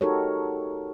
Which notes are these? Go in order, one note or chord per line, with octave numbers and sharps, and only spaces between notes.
D#4 F#4 G4 A4 A#4 C#5